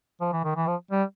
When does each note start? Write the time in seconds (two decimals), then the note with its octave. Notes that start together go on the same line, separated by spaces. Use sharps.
0.21 F3
0.33 E3
0.44 D#3
0.56 E3
0.67 F3
0.91 G3